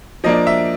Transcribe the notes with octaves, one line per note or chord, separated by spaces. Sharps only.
F3 A#3 D4 D#5
E5